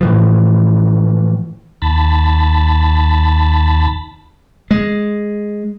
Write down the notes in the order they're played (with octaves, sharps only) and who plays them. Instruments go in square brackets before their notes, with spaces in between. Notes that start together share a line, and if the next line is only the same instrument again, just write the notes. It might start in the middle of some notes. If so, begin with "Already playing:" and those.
[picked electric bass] A2 E3 F3
[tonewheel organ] D#2 A5 B5
[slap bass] G#3